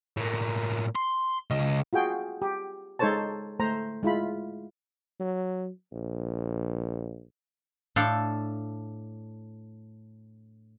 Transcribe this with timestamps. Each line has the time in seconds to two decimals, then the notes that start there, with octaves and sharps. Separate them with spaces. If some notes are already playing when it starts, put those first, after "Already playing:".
0.17 A2 A#3
0.96 C6
1.50 C#2 D#5
1.93 F4 F#4 G#4 G5
2.42 G4
2.99 G#3 D#4 A4 C5 C#5 A5
3.60 A3 C5 A#5
4.03 G#3 E4 F4 B5
5.20 F#3
5.92 A#1
7.96 A2 D4 A4 F5 G5 C6